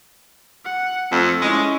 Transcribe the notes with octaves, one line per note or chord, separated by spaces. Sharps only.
F#5
F2 A3 A4
G#3 C#4 E4